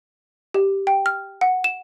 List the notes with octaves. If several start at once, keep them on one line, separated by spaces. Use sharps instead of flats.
G4
G5
F6
F#5
E7